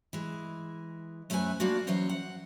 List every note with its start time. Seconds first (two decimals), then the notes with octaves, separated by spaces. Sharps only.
0.13 E3 G#3
1.30 F#2 A3 C4 A#4 B4 G#5
1.60 G3 A#3 D4 F4 F#4
1.87 E3 F#3 C#4 C5 C#5
2.10 F#5